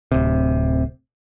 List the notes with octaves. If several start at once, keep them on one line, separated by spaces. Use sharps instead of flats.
D1 C3